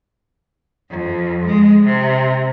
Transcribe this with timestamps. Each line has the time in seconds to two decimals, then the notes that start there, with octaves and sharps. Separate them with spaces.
0.90 F2
1.46 G#3
1.86 C3